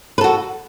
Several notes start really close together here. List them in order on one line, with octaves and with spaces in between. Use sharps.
B4 A4 F#4